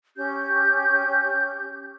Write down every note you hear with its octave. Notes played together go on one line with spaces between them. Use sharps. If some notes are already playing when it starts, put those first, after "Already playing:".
C#4 G4 G6